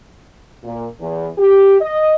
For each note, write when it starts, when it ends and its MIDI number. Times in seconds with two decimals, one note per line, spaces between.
0.63 0.87 46
1.00 1.28 40
1.38 1.75 67
1.81 2.16 75